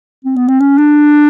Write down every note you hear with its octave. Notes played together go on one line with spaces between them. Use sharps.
C4
B3
C4
C#4
D4